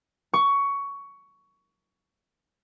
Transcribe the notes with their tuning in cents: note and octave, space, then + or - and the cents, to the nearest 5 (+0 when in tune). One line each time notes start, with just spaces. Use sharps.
C#6 +15